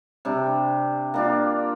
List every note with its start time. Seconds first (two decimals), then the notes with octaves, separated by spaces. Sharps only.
0.25 C3 G3 D4
1.14 A#3 D4 F4